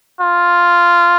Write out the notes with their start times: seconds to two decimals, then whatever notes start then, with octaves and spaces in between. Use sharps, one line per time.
0.21 F4